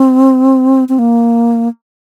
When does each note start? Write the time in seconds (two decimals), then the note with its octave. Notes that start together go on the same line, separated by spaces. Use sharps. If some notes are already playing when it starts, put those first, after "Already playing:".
Already playing: C4
0.89 C4
0.99 A#3